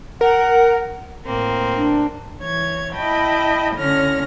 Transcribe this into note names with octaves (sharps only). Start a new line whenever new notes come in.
A#4 F#5
A2 A#3 C4
D4
E3 C#5 G#6
E4 D#5 G5 A5 B5
A2 D3 C#4 F6 A#6